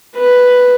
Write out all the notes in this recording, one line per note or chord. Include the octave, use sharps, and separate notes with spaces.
B4